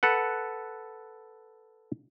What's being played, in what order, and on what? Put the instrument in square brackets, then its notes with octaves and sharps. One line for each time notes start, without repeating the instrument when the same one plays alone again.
[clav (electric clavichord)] A4 B4 F#5